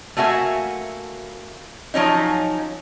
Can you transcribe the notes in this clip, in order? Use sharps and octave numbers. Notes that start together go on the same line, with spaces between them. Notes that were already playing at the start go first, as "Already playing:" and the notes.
A3 A#3 F#4 E5 G#5
F3 F#3 C#4 D#4